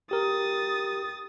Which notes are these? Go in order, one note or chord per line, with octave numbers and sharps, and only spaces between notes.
G4 A#4 D#6 A6